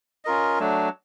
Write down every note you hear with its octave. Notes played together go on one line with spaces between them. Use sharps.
C#4 F4 A#4 D#5
F#3 A3 D4